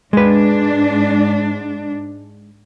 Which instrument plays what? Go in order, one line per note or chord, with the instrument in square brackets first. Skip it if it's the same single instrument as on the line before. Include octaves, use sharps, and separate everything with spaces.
[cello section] G#2 D4 [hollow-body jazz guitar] G#3 B4